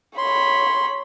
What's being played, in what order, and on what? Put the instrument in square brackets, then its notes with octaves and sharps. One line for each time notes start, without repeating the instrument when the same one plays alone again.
[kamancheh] C#5 B5 [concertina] C6